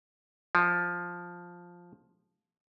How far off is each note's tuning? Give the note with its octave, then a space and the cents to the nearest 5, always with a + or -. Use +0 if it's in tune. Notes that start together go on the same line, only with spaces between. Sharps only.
F3 +5